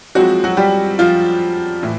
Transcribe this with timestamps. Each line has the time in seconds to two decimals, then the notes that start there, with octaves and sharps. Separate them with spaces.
0.15 F3 F#3 G#3 C4 F#4
0.44 F#3 F#4
0.57 G3 G4
0.99 F3 F4
1.83 A2 E3